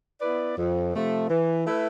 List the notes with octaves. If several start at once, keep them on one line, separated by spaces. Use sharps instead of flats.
B3 E4 B4 D5
F2
C3 F3 A3
E3
A3 E4 B4